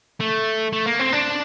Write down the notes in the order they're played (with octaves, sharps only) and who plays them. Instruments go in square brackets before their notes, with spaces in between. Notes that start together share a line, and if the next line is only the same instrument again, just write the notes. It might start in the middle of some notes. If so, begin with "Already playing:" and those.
[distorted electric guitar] A3
A3
A#3
C4
D4